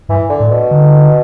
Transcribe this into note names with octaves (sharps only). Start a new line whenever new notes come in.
G2 E3
D3
A2
B2
D3